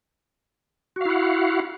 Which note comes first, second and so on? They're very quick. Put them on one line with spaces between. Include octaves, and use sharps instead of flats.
F#4 F5 E4 F#5